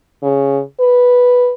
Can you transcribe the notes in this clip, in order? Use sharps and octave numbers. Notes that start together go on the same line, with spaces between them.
C#3
B4